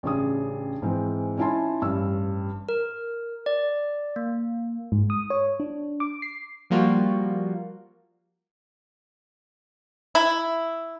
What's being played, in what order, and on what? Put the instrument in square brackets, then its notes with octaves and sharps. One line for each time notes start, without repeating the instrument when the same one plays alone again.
[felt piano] A1 C#3 D4 G#4 D#6
G#2 E3 G#3 C4
C#4 D#4 E4 G#5 A5 C6
A1 G2 E6
[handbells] A#4
D5
A#3
[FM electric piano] G#2
D#6
C#5
D4
D6
C7
[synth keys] F3 G3 A#3 F4 F#4
[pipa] E4